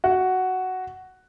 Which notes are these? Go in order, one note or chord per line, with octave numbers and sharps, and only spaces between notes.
F#4